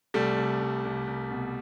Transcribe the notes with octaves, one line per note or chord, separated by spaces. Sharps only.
C2 G3 A3
C2
C2
C2
C2
B2